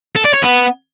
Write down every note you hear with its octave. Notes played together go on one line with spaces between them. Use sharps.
A4
D5
C#5
B3